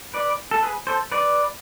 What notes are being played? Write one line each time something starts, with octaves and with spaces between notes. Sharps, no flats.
B4 D5
A4
G#4 B4
A4 C5
B4 D5